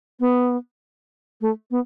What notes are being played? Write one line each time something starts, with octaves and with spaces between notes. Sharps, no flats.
B3
A3
B3